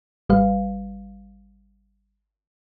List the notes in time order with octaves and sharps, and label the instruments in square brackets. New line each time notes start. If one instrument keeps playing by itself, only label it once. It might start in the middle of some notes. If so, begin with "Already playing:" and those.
[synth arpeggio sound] G#1 G3 B4 F5